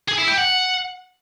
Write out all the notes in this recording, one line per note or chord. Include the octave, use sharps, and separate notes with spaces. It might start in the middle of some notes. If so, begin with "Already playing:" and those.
G#4
E4
G4
F#5